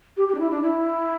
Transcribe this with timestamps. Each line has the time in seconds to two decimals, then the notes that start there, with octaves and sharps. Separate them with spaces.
0.17 G4
0.28 G4
0.35 D4
0.39 E4
0.51 D4
0.62 E4